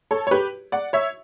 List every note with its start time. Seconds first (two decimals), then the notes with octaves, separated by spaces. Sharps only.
0.11 A4 C#5
0.27 C#5
0.31 G4 B4
0.72 D5 F#5
0.93 C#5 E5